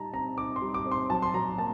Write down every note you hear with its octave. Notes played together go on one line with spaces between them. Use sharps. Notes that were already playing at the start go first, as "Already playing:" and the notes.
Already playing: G3 D#4 A5 A#5
C4 A#5
D#4 D6
C6
G3
D6
C4
C6
F#3 A5
C6
F#3 A#5
A#3 A5